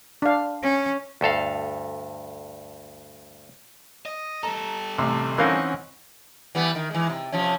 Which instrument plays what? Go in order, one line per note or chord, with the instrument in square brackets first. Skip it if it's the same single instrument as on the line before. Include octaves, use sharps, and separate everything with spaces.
[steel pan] D4 F5
[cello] C#4
[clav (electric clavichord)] D2 G2 A4 F5
[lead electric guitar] D#5
[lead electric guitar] G3 A4 [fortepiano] A#5
[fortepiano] A1 [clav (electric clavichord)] C3
[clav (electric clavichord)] E3 C4 D#4 [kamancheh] C#4 F#5 [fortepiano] A#4 F5
[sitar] E3 G3 B3
D#3
E3 G#3
C3
C3 F3 C#4